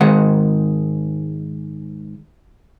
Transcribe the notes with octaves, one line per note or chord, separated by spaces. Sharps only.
G#2 D#3 G#3 F#5